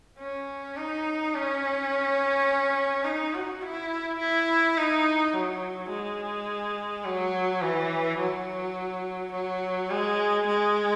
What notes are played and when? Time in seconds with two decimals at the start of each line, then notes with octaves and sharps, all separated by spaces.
0.19 C#4
0.77 D#4
1.34 C#4
3.04 D#4
3.34 F#4
3.62 E4
4.19 E4
4.76 D#4
5.34 F#3
5.90 G#3
7.05 F#3
7.61 E3
8.18 F#3
9.32 F#3
9.90 G#3
10.46 G#3